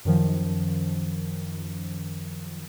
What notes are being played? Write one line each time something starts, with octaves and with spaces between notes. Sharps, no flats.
F#2 D#3 F3